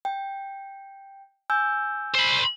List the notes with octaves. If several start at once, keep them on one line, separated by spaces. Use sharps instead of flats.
G5
G#5 E6 G6
C5 B5